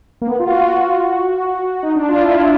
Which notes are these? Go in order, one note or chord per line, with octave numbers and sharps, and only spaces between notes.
A#3
B3
F4
F#4
F4
F#4
D#4
D4
F4
E4